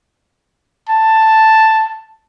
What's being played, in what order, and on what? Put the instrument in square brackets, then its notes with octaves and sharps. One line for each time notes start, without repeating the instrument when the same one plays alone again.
[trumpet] A5